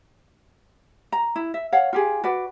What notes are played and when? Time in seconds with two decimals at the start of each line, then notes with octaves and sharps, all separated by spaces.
1.12 A#5
1.36 E4
1.54 E5
1.72 C#5 F5 F#5
1.93 F4 G4 G#4
2.24 F#4 B4 D5